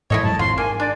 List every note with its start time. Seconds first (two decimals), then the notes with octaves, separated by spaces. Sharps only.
0.10 G#2 E3 E4 A4 C#5 D#5
0.23 F2 F#3 G#3 A5
0.39 G#1 F2 A2 F4 C6
0.58 G#2 A#3 G#5
0.80 D4 D5